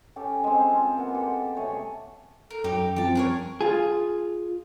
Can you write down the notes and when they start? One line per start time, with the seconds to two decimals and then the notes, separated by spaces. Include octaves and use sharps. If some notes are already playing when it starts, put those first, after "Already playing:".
0.16 C#4 G4 A4
0.44 G#3 C4
0.67 F4 G#5
0.97 A#3 B3 F#5
1.14 G4 A4
1.57 C3 A3 G#4 C#5
2.50 A4 A#4
2.64 F#2 D#4 G4
2.96 F3 G3 C4 F4 G4 A5
3.15 G#4 A#4 C#5
3.61 F4 G#4